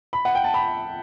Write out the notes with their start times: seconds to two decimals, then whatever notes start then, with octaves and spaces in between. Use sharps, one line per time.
0.13 B5
0.25 F#5
0.35 G5
0.44 A5
0.54 B5